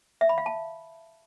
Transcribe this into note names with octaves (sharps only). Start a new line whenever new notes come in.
E5
B5
F5
A5